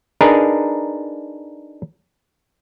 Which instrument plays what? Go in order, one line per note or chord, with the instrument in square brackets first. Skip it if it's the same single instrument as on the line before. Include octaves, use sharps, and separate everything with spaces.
[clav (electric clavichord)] D4 D#4 G#4 A#4 B4